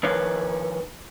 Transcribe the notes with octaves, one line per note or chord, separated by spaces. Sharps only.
D#3 F3 B4 C#5